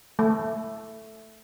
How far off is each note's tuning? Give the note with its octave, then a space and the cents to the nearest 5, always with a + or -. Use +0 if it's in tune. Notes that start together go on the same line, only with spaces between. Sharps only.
A3 +5